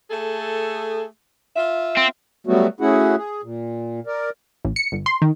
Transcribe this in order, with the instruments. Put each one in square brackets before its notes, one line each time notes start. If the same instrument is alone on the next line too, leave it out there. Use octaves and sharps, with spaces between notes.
[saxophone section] A3 G#4 A4
F4 E5
[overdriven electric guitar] C4
[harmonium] F#3 G3 A3 B3 F#4
A3 C#4 E4 F#4 G#4 F#5
G#4
A#2
A#4 D5
[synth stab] A1
C#7
G1
C6
D#3